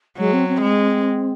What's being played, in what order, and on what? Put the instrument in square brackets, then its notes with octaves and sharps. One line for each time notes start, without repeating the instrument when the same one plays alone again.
[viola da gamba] F#3 [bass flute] G#3
[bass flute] C4
C4
[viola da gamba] G#3